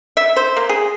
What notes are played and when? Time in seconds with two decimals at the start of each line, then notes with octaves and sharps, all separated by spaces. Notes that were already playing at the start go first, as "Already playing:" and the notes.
0.17 E5
0.36 C5
0.57 A#3
0.69 G#4